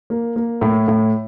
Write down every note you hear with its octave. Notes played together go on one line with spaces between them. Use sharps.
A#3
A#3
A2
A2